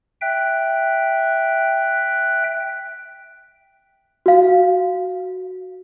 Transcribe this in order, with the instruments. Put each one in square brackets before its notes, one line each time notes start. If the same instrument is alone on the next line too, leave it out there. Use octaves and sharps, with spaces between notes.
[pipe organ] E5 G5 F#6
[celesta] F#4 F5